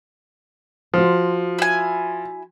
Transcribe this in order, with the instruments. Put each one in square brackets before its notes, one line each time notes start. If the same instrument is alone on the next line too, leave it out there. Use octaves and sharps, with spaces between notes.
[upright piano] F3 [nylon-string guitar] F#4 C5
[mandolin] E4 G#5